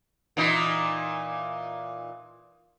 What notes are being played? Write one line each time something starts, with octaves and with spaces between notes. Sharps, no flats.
A#2 E3 D#4